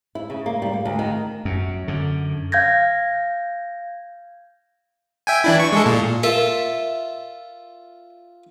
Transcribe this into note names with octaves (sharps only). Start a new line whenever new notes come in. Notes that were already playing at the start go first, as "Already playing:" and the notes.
E4
C#3
A#3
G3
A#3
D2
D#3
F#2
F#2 D3
F5 G6 G#6 A#6
E5 G5 G#5
E3 D4 E4
C#6
G#3 G#4 A4
A#2
F4 A4 A#4 E5